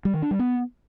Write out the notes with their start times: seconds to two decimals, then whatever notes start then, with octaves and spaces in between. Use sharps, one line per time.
0.05 G3
0.14 D#3
0.22 D4
0.31 G3
0.39 B3